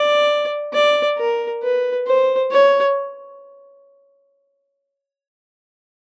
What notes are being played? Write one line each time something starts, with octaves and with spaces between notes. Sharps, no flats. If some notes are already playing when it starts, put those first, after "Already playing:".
Already playing: D5
D5
A#4
B4
C5
C#5